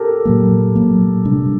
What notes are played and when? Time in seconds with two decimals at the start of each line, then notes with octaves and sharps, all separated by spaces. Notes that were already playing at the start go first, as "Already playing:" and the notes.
Already playing: G4 A4 A#4
0.25 A#2 F#3 A#3
0.75 A#2 F#3 A#3
1.25 C3 G3 D4